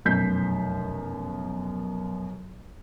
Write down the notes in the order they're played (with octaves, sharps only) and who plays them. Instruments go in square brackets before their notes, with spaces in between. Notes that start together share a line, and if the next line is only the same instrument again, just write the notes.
[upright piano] F1 F#2 B2 G6 B6 C7